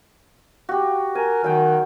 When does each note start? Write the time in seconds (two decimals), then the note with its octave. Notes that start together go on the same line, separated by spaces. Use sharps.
0.69 F#4 G4
1.15 A#4 G#5
1.44 D#3 F#3 G5